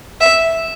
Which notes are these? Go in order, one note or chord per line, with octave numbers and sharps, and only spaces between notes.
E5